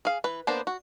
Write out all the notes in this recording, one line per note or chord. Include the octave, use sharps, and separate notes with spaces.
G#4 F5
E3 B4
A#3 B3 D4 B4 C5
F#4